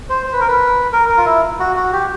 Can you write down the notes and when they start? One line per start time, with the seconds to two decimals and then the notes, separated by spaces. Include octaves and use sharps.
0.10 C5
0.26 C5
0.33 B4
0.40 A#4
0.48 B4
0.93 A#4
1.09 A#4
1.17 F4
1.26 E4
1.60 F#4
1.76 F#4
1.93 G4